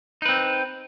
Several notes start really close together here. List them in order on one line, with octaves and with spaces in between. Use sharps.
D#4 B4 C4